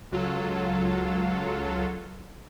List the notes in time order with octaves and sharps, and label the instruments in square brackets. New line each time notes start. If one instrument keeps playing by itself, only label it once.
[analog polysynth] C#2 F#3 F4 A4